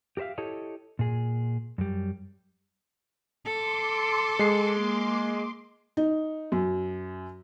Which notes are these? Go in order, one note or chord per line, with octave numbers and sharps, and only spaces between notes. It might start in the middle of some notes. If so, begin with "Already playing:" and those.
G4 A#4 C5 E5 F5
E4 G4 A4 C#5 D#5
A#2 G#4
F#2 G3
A4 C6 D6
G#3 C7
A#3
D#4
F#2